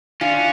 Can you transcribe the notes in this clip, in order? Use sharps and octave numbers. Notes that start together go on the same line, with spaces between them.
C#4 D4 F4